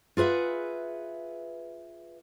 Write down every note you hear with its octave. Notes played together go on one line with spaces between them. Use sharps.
F4 G#4 B4 E5 F#5